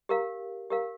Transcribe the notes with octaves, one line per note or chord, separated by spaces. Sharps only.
G4 A#4 F5
G4 A#4 F5